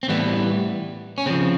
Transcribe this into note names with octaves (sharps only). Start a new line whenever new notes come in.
C4
A2 E3 G3 B3
C#4
C#3 F3 C4